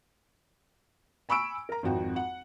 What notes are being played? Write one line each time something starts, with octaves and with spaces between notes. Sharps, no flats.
G#5 B5 C#6 E6 D7
A#4 A#5
G#1 F2 F#4 G5
F#5